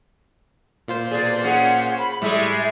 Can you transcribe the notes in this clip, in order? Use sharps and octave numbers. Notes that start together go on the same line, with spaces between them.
A#2 F4 C5
B2 G#4 D5
C#4 G#4 F#5
B5
A2 G3 G#3 G#4 E5 C#6